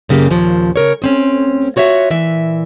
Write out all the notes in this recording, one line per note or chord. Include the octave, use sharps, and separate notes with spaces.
F#2 C#3 A#3 G4
D#2 A#2 C#3 F3
C#3 A#4 C#5
D2 C4 C#4
F4 F#4 C#5 D5 E5 F#5
A#2 E3 E5